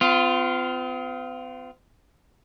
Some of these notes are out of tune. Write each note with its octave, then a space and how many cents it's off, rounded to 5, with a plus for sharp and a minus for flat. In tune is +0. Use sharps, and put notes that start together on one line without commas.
C4 -45 F4 +0